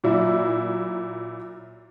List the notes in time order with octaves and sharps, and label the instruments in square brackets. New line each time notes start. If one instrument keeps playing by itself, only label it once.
[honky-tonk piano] A#2 F#3 E4